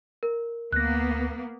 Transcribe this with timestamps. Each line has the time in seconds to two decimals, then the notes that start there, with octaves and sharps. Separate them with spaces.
0.23 A#4
0.73 D2 A#3 B3 F#6 A#6